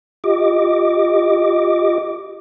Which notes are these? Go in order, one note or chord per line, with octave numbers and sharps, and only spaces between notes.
F4 G4 D#5 D6